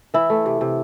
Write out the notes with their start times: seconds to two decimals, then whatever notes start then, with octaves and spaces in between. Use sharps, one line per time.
0.14 E3 E4
0.30 A3
0.46 C3
0.61 C3